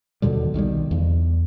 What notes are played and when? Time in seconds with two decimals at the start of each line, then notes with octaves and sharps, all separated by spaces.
0.22 D#2 B2 D3 G3
0.54 B1 D#3 F#3 G3
0.91 E2